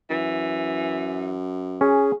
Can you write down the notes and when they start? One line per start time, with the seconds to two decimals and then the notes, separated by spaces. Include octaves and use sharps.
0.10 F#2 E3
1.81 C#4 G#4